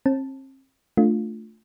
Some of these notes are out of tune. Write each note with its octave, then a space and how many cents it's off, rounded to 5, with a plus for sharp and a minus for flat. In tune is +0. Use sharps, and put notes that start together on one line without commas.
C4 +40 A5 +0
A3 +5 D4 +0 F4 +0